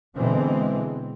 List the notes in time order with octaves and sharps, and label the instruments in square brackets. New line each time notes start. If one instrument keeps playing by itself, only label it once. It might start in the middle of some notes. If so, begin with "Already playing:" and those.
[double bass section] B2 D3 E3 G#3 C4